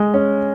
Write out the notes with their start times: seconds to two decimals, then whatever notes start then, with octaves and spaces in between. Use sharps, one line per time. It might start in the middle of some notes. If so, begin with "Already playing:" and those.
Already playing: G#3
0.14 C#4